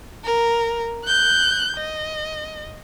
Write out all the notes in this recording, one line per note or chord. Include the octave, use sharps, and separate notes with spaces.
A#4
F#6 G6
D#5